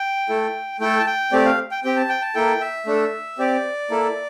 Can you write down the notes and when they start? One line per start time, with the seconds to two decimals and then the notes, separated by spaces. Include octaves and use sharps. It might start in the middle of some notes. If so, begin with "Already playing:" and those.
Already playing: G5
0.29 A3 E4 A4
0.80 A3 E4 A4 G5
0.99 A5
1.06 G5
1.32 A3 C4 G4 D5
1.45 F5
1.71 G5
1.84 C4 G4 G5
1.96 A5
2.09 G5
2.22 A5
2.35 A#3 E4 A4 G5
2.61 E5
2.86 A3 D4 A4
3.38 C4 G4 D5
3.90 A#3 E4 A4